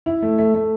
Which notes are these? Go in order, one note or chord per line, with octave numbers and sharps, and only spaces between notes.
E4
A3
A3
A3